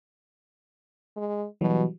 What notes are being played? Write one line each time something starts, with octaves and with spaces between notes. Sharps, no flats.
G#3
B2 E3 F#3 G3